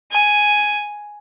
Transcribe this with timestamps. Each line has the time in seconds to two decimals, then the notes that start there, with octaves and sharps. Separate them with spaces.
0.11 G#5